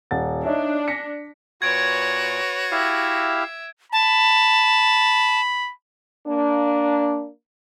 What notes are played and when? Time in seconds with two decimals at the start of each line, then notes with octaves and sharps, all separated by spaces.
0.11 D#1 F#5 A6
0.45 D4 D#4 C#5 E5
0.88 A#6 B6 C#7
1.62 A#2 F#4 B4 C#5 G#6 D7
2.72 E4 G4 E5 F5
3.93 A5 B5
6.27 A#3 D4